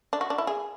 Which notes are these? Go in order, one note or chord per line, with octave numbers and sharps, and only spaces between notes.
D4
F#4
D4
E4
G#4